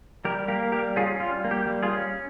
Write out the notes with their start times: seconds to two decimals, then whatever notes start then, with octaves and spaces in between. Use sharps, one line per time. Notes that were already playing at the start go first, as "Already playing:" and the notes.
0.25 G3 G4 A#4
0.48 A#3 G4 A#4
0.72 G3 G4 A#4
0.96 C#4 F4 G#4
1.19 G3 F4
1.44 A#3
1.51 G4
1.67 G3
1.83 F4 G#4
1.91 C#4